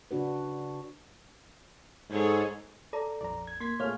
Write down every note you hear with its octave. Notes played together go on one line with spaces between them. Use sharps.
C#3 D4 F#4 B4
G#2 G#4 A4 C#5
A4 D5 A#5
A#1 F2 D5 A#5
G#6
A#3 C6 G#6 B6
A#2 A3 G#4 C#5 F5 F6